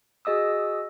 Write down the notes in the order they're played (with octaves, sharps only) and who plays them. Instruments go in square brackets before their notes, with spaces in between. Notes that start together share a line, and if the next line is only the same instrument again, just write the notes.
[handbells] F#4 G#4 D#5 D#6 E6